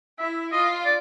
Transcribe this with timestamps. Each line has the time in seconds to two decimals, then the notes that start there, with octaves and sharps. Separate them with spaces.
0.19 E4 E5
0.52 F4 D#5
0.85 D5